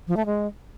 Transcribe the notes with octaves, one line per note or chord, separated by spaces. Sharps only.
F3
A3
G#3